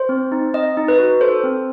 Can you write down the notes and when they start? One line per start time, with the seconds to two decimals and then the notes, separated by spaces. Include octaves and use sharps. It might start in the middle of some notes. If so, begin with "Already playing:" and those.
Already playing: C5
0.09 C4
0.32 D#4
0.54 C4 D#5
0.77 D#4
0.88 B4
0.98 F#4
1.21 A4 C5
1.44 C4